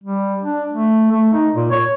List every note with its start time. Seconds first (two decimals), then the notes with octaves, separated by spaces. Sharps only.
0.04 G3
0.42 D4
0.72 A3
1.11 A3
1.33 D#4
1.54 A#2
1.71 C#5